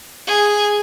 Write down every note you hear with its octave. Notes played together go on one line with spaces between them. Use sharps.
G#4